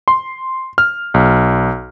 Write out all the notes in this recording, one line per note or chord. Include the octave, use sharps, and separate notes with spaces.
C6
F6
B1